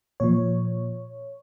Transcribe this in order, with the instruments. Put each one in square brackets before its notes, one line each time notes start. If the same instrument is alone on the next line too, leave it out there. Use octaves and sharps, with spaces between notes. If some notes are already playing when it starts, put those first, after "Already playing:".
[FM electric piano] A#2 F3 C#5